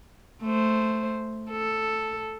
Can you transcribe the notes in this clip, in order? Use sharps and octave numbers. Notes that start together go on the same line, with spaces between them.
A3 C5
A4